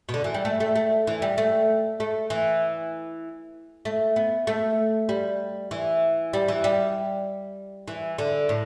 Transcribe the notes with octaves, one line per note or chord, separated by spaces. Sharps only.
B2
D3
E3
G3
A3
A3
A3
E3
G3
A3
A3
E3
A3
B3
A3
G3
E3
G3
E3
G3
E3
D3
A2